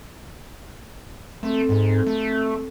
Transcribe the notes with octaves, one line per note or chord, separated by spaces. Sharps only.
A3 C4 A4
G#2
A3